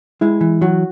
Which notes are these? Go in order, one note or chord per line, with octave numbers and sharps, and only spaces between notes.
G#3 E4
E3
F#3 F#4